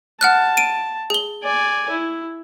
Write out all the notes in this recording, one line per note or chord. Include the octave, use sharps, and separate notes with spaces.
F#5 A5 F6 F#6
D7 D#7
G#4 G7
D5 G#5
E4